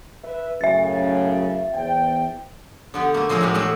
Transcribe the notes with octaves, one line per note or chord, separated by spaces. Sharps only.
B4 E5
F#2 A2 C#3 E5 A6
E2 C5 G5
D3 B3 G4
A3 A#3
F3 G3 C4 G#4 A#4 C#5
A2 G#3 F#4 G4 F5
E2 A3 E4 F#4 G5